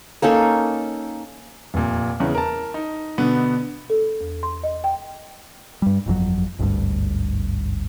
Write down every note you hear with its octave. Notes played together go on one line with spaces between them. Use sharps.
A#3 C#4 D#4 A4
F1 A#2
E2 C#3
A#4 A5
D#4
B2 D3 B3
A4
E2
C6
D#5
G5
G2 G3
G1 F2 B2 F#3
G#1 D2 G2